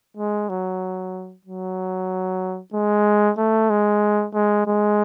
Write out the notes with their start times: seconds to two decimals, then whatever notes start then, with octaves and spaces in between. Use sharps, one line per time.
0.17 G#3
0.49 F#3
1.45 F#3
2.74 G#3
3.38 A3
3.70 G#3
4.34 G#3
4.66 G#3